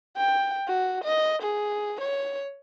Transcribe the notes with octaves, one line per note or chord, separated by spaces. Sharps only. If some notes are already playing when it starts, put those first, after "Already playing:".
G5
F#4
D#5
G#4
C#5